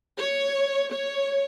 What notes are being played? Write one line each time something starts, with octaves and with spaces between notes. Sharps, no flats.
C#5
C#5